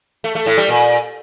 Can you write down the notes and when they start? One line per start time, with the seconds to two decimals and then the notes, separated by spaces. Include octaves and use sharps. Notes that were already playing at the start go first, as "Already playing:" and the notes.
0.24 A3
0.35 A3
0.46 A2
0.57 G3
0.68 A#2